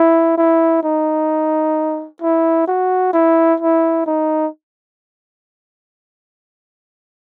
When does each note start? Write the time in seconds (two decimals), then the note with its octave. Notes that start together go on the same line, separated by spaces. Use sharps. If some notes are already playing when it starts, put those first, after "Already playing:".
Already playing: E4
0.37 E4
0.83 D#4
2.21 E4
2.67 F#4
3.13 E4
3.60 E4
4.06 D#4